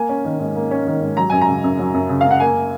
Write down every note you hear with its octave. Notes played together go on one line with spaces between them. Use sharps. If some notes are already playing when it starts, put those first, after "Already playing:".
Already playing: A#3 G#5
C#4
D#3
G#2
A#3
C#4
D#3
G#2
F#3 A#5
F#2 G#5
A#5
C#3
F#2
F#3
F#2
C#3
F5
F#2
F#5
A#3 G#5